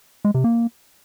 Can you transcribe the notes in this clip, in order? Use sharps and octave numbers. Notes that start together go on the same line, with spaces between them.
G#3
C3
A#3